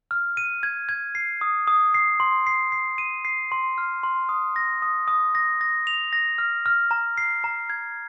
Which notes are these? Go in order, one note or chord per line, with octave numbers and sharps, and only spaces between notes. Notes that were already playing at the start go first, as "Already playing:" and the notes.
F6
D#7
G#6
G#6
C7
D#6
D#6
C7
C6
C7
C7
D#7
C7
C6
F6
C6
D#6
A#6
D#6
D#6
A#6
A#6
F7
A#6
F6
F6
A#5
C7
A#5
G#6